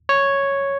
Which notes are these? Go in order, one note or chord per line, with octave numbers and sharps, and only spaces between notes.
C#5